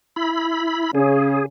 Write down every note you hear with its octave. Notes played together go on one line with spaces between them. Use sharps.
E4 B5
C#3 C#4 G#4